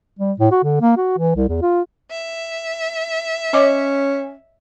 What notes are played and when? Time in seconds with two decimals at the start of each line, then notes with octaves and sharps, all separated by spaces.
0.19 G3
0.39 A2
0.51 F#4
0.64 D3
0.81 A#3
0.97 F#4
1.18 E3
1.36 C2
1.48 E2
1.62 F4
2.11 E5
3.53 C#4 C#5 D#5 D6